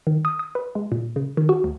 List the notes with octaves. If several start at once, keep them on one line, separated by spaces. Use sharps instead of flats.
D#3
D#6
D#6
B4
G#3
A#2
C#3
D#3
F#4
D2